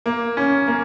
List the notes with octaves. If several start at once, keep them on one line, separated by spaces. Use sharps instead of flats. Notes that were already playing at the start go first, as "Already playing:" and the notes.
A#3
C#4
A#3